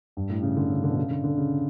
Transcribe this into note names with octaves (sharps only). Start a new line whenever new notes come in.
G2
A2
C#3
D3
C#3
D3
B2
C#3
D3
D3
C#3